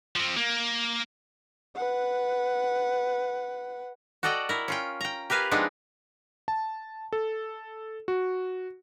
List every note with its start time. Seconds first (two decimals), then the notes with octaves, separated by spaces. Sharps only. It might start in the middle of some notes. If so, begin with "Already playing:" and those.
0.16 F3 C4
0.37 A#3
1.75 B4 F#5
4.23 F#4 A4 D5 D#5 F#5 G5
4.49 E4 A#4
4.68 C#4 F4 G5
5.01 G5 A#5
5.30 G4 A#4 B4 F5 G#5
5.51 F3 G#3 B3 C4 D4 D#4
6.48 A5
7.13 A4
8.08 F#4